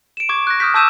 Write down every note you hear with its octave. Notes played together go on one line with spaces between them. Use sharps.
D7 E7
C#6 D6 G#6
F#6 A#6
D#6 F6 G6 B6
A5 D6 E6 G6 D#7 E7